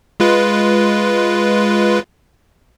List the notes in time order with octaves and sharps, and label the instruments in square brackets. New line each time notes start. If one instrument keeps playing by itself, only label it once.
[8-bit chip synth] G#3 F4 B4